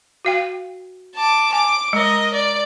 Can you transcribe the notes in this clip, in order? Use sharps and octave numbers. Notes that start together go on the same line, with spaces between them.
F#4 F5 G5
A5 D6
G#5 D6
G#3 A#4 D#5
D5